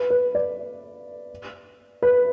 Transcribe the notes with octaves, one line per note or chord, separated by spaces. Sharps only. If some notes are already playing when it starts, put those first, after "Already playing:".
Already playing: B4
B4
D5
B4